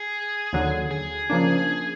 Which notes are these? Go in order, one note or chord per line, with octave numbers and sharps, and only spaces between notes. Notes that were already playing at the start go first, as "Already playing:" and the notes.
Already playing: G#4
D#2 D3 F#3
G#4
C#3 F3 A#3 D4